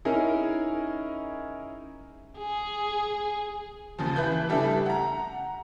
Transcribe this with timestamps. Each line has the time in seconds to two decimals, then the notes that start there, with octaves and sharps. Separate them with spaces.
0.05 C#4 D#4 E4 G#4 A#4
2.38 G#4
3.99 D#2 C#3 F3
4.16 E3 B4 G6
4.49 C#3 G3 A3 D4 E4
4.86 F#5 A#5